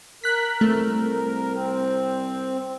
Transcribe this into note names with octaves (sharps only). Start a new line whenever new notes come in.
A#4 F#6 B6
C2 A3
C4